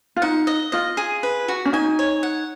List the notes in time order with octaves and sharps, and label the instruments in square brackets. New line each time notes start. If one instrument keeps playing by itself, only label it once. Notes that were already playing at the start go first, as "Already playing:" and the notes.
[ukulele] F4
[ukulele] D#4 [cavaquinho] F#5
[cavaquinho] D#5
[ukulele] F4 [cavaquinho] D#5
[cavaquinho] G#4
B4
F#4
[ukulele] C#4
[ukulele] D#4 [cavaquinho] G#5
[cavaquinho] C#5
F#5